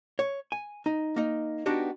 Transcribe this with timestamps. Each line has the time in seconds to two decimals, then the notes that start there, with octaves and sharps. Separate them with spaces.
0.19 C#5
0.52 G#5
0.86 D#4
1.16 A#3 D#4
1.66 B3 D4 D#4 F#4 G4